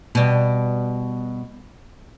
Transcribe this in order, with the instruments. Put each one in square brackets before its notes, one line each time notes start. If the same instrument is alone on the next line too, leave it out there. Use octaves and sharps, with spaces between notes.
[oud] B2 G3